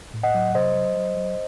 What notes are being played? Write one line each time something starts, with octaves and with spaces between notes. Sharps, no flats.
A2
D#5 F#5
F#3
C3 C5 D#5
F#3
F#3
F#3